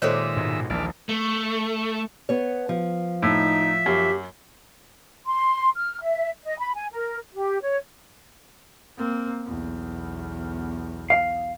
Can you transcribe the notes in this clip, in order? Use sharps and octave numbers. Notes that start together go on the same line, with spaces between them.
A#2 D#3 G#3 G4 A4 C5 C#5 E5
G#2 B2
A#1 D#2 E3 D5 F6
A3
B3 C#5
F3
A2 D#4 E5
F#2 G4
C6
F6
E5
D#5
B5
G#5
A#4
G4
C#5
A#3 C4
B1 E2
F5